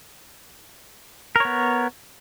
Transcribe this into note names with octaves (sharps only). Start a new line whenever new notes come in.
B3 A#4 C#5